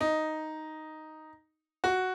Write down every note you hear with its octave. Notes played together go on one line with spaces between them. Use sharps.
D#4
F#4